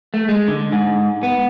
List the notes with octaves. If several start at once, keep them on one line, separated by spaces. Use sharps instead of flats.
A3
G#3
D3
G#2
B3